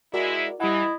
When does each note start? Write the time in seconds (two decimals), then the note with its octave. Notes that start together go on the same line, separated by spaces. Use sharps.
0.14 G#3 E4 F#4 A#4 D5
0.60 E3 G3 E4 D#5 F#5